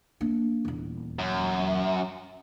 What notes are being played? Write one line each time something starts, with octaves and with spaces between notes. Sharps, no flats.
A#3 D4
D#1 E2
F#2